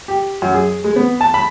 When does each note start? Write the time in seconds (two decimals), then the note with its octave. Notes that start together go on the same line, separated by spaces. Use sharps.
0.08 G4
0.42 F#2
0.54 G#4
0.84 G#3
0.96 B3
1.21 A5
1.34 B5